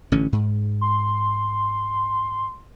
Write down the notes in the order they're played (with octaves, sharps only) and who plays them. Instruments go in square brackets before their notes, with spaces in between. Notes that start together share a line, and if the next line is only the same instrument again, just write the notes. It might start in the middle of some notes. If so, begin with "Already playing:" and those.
[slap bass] A1 D3 C#4
G#2
[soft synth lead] C6